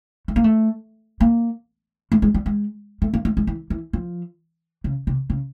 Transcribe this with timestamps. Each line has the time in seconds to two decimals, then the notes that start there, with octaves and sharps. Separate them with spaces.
0.28 A3
0.36 A#3
0.44 A3
1.21 A#3
2.12 A3
2.22 G#3
2.34 G3
2.46 G#3
3.02 A3
3.14 A#3
3.25 A3
3.37 G#3
3.47 E3
3.70 E3
3.93 F3
4.84 C#3
5.07 C3
5.30 C#3